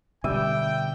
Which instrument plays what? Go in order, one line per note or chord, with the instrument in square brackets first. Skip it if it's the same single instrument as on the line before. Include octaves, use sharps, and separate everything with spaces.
[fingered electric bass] B2 D3 [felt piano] G3 D#7 [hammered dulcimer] E5 [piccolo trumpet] G5